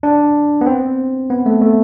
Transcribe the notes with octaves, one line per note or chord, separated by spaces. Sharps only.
D4
B3
C4
B3
A3
A3